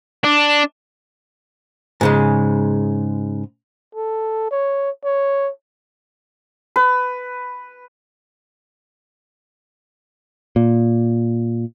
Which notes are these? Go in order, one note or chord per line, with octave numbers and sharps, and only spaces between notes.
D4
G#2 C#3 G#3
A4
C#5
C#5
B4
A#2